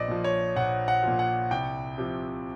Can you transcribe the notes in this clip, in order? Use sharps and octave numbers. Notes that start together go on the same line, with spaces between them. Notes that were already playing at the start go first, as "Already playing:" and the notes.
Already playing: A#1 D5 D#5
A#2 F3
C#5
A#1 F#5
F#5
A#2 F3
F#5
C2 G5
C3 F3